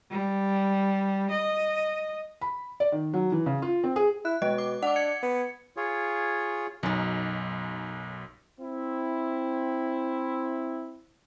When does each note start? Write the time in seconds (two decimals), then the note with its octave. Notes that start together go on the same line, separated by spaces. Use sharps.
0.11 G3
1.31 D#5
2.41 B5
2.80 D5
2.92 D#3
3.14 F#3
3.32 E3
3.46 C#3
3.62 F4
3.84 C4
3.96 G#4
4.25 E4 F#6
4.42 B2 G#3 D#5
4.58 D6
4.83 D4 F#5 D6
4.96 G#6 C#7
5.23 B3
5.77 F4 G#4 C#5
6.83 B1 F#2 C#4 D#4
8.61 C4 E4